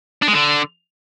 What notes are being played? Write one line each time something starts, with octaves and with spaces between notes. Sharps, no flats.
D4
G#3
D3